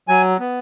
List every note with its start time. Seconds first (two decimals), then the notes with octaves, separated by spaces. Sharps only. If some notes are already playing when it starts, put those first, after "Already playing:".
0.08 F#3 G#5
0.40 B3